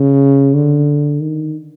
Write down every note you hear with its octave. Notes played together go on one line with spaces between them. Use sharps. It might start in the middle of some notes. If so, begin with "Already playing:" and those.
Already playing: C#3
D3
D#3